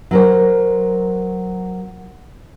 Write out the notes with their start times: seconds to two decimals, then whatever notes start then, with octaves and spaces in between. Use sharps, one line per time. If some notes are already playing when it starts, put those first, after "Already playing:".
0.11 F#3 A#4 C5